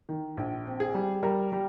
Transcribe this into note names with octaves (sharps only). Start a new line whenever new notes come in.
D#3
A#1
C4
G#4
G3
G3 A#4
G3